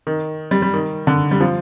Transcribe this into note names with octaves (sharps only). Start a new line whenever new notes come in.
D#3
G3
G3
D#3
D3
G3
F3